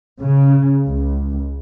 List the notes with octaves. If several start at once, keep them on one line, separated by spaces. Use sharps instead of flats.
C#3
C#2